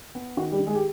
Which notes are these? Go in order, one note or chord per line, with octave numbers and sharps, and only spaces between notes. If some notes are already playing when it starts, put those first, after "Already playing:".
B3
D#3 F#4
G3 G4
D#3
G#3 G#4
G4